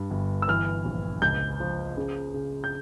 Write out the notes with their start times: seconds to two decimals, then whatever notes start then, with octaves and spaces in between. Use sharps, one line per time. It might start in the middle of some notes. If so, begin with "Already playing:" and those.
Already playing: G2
0.11 G1
0.42 E6
0.48 E3 F6
0.85 A#1
1.22 C#2 G6
1.60 F3
1.97 C#3
2.34 C#3
2.64 G6